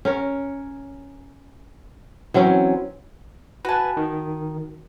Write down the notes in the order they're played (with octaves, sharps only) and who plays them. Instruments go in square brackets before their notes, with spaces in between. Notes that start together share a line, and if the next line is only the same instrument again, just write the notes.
[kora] C#4 A#4 C#5
E3 F#3 C4 C#4
[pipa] F#4 A5 [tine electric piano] B4 G#5
[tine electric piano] D#3